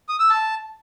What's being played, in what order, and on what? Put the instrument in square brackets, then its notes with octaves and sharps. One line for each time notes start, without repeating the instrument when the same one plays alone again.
[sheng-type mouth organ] D#6
E6
A5